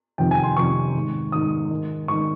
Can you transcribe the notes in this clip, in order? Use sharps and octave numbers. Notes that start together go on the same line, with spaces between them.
F2 C3 D#3 G5
G#5
C6
F2 C3 D#3 C#6
G#2 D#3
G#2 D#3 D#6
G#2 D#3
G#2 D#3 C#6